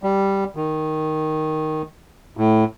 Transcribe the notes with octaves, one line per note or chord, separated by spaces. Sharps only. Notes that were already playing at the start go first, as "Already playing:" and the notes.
G3
D#3
A2